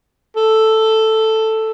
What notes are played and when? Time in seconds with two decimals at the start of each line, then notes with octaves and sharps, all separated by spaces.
0.36 A4